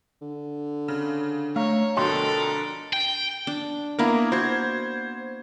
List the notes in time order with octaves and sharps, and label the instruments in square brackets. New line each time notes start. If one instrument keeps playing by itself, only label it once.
[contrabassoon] D3
[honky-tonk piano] C#3
[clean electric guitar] A3 [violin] C#5 [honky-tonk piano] F5 A#5
[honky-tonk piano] F2 B2 D3 [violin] A4 A#4 [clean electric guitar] D#5 G5 C6
[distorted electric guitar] G5
[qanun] D4
[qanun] A#3 B3 D4 [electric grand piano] E4 A#4
[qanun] F#4 [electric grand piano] C5 G#6